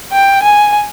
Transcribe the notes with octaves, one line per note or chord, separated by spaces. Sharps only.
G5
G#5